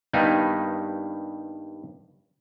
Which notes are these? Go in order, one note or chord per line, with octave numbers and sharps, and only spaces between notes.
G2 D#3 G3 A#3 B3 D#4